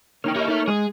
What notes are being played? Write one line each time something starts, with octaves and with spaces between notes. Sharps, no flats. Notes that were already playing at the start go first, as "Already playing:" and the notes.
D3 A#3 D#4 C#5 G5 F6
D#4 E4 G4 D#5
D#4 A4 E5
G#3 G#4